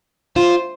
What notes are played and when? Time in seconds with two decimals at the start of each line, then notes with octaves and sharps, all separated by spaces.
0.36 F4 C5